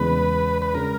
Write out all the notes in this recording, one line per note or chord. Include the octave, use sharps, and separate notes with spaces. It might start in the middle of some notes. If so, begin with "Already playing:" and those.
Already playing: E2 C#3 G#3 B4
B4
C#3 G#3 A#4